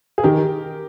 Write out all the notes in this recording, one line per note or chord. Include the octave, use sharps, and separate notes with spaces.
G#4
D#3 G4 A#4